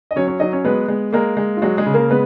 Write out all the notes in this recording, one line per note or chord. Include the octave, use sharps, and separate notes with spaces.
D#5
F#3 C#4 C#5
C#4 C#5
F#3 D#4 D#5
C#4 C#5
G#3 B3 B4
G#3
G#3 A#3 A#4
G#3
F4
F#3 G#3 F#4
G#3 G#4
C#3
A#3 A#4
G#3 B3 B4